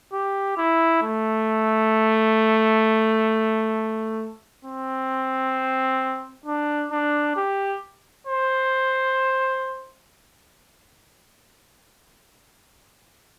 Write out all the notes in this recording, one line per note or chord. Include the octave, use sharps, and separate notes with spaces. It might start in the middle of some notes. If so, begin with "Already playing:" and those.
G4
E4
A3
C4
D4
D4
G4
C5